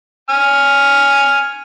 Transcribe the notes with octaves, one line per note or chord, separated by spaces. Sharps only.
G#5 F6